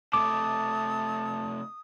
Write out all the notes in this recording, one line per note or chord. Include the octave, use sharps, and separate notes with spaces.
C3 A3 A5 D6 D#6